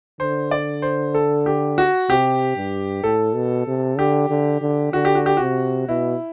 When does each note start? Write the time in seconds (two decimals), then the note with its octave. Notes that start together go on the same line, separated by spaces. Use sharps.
0.20 D3 C5
0.51 D5
0.82 C5
1.15 A4
1.46 G4
1.78 F#4
2.10 C3 G4
2.56 G2
3.04 A2 A4
3.35 B2
3.67 C3
3.98 D3 G4
4.30 D3
4.62 D3
4.93 D3 F#4
5.05 G4
5.15 F#4
5.26 G4
5.37 C3 F#4
5.88 B2 E4